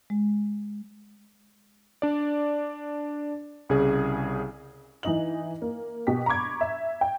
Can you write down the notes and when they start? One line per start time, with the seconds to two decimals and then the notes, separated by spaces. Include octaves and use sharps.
0.10 G#3
2.02 D4 D5
3.69 C2 C#3 G#4
5.03 E3 D#4 D#5 F#7
5.62 A#3
6.07 B2 G4 B6
6.26 A#5 B5 C#6 D6 G#6
6.61 E5
7.01 G5